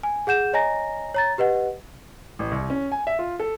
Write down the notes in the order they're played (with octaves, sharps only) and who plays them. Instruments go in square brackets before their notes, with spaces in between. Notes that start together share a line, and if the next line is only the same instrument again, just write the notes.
[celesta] G#5
G#4 F#5 G6 E7
C#5 D#5 G#5 A#5 A#6
C#5 A#5 A6
G4 B4 D#5 F#5
[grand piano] A1
C2
C#4
G#5
E5
F4
A4